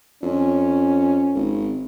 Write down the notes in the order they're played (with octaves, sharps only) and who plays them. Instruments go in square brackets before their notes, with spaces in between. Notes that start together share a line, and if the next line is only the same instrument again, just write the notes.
[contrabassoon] F2 [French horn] C#4
[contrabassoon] G#1